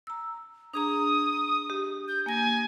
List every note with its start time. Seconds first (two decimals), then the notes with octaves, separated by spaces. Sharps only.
0.07 A#5 E6
0.74 D4 G#4 A#5 D#6
1.70 G4
2.08 G6
2.26 A#3 G#5 A#6